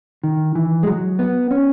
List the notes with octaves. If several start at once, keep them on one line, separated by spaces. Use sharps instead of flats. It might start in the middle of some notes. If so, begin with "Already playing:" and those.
D#3
E3
G#3
F#3
B3
C#4